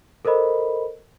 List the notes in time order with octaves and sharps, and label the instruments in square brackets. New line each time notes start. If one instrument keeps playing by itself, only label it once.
[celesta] A4 A#4 C5 D#5 B5